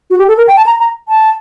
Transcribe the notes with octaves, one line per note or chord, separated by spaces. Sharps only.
F#4
G4
A4
A#4
G5
A5
A#5
A#5
A5